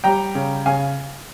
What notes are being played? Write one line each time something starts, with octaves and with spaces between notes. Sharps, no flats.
G3 G5 A#5
C#3
C#3 F5 G#5